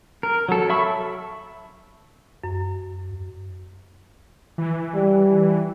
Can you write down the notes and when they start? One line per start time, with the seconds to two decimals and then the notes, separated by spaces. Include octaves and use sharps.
0.23 A#4
0.49 F#3 A4
0.70 E5 A5 B5 C#6 E6
2.44 F#2
4.58 E3
4.94 G3